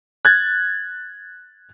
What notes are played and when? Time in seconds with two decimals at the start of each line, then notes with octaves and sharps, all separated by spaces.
0.25 F#6 G#6 A6